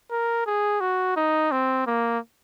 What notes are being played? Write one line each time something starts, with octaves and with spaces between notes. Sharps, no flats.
A#4
G#4
F#4
D#4
C4
A#3